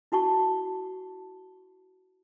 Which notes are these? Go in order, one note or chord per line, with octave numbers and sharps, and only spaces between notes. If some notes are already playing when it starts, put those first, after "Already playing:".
E4 F#4 A5 C#6